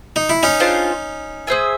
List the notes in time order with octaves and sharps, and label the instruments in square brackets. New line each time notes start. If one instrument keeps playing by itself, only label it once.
[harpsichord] D#4
E4
C#4 D#4
[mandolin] D4 F4 G#4 C5
G#4 C5 E5 G#5